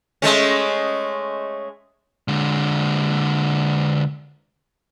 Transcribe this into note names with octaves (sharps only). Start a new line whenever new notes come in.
G#3 A3 C#4
D3 G#3